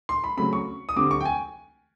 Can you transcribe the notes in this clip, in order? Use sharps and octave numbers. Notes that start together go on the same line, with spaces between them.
C6
B5
C#3 F#3 A3 C4 B5
C#6
D#6
D3 G3 C4 D6
C#6
G5
G#5